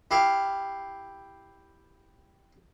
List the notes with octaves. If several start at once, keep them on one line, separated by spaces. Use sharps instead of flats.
E4 G4 F5